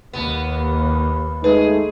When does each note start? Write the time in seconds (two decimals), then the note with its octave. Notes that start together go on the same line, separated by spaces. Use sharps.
0.13 D#2 B3
1.44 G#3 A3 D#4 G#4 B4